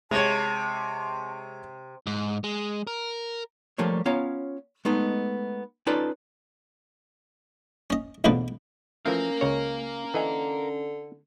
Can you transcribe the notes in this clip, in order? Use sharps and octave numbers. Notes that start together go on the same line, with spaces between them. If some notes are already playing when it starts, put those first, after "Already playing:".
C3 G#3 C#5 A5
G#2
G#3
A#4
F3 G3 A3 A#3 C#5
B3 C#4 F4 C#5 F5 A#5
G#3 A3 B3 D#4
C#4 D#4 F4 A4 B4 D5
C#4 D#5
A1 E2 B2 D3 F3 B4
E3 F3 A3 A#3 C#4 A#4 F5
C#2 C#3 C#5
D3 E3 D#5 G#5